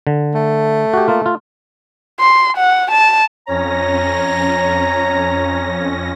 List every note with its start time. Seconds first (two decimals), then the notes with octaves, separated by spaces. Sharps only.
0.07 D3
0.34 A3
0.93 F#4 G4
1.08 A#3 F4
1.26 F4
2.20 C6
2.57 F#5
2.91 A5
3.47 F2 C#4 C#5 A#5 A#6